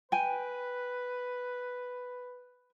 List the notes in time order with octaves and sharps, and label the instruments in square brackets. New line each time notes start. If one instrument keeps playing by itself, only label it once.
[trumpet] B4 [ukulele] G5 G#5